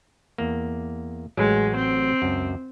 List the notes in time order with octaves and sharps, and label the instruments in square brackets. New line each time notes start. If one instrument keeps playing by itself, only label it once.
[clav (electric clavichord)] E2 A#3
[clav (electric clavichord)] A1 F#3 F#4 [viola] G#3
[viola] C4
[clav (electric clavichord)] C#2 F#2